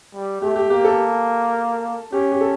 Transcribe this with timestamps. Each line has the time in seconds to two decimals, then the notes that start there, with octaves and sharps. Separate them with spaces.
0.14 G3
0.42 A3 G4
0.56 G4
0.70 A#3 G4
0.84 A4
2.12 C#4 G4
2.32 G4
2.41 A4